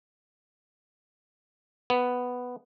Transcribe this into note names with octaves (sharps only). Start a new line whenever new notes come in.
B3